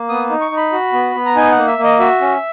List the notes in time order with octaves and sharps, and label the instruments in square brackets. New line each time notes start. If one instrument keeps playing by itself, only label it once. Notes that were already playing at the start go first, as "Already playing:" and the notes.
Already playing: [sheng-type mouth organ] A#3
B3 D#6
D#4
C#6
D#4
B5
F#4
B3
B3
A#5
D#4 G#5
F#5
A#3
E5
A#3
D#5
F#4 E5
C#4